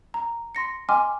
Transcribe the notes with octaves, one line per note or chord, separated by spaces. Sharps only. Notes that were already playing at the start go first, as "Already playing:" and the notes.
A#5
C6 A#6 C#7
D#5 G5 G#5 C6 D6 F6